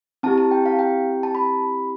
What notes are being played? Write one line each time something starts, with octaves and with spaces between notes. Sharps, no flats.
C4 E4 G4 A5
A5
G5
F5
G5
A5
B5